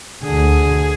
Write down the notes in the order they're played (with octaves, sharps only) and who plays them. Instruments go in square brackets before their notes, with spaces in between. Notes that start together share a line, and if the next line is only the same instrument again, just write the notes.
[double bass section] D2 D3 [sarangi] G#4